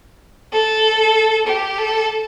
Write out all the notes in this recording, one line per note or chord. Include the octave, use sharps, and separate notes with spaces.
A4
G4
A4